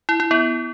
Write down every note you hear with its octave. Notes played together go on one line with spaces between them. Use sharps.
E4
E4
B3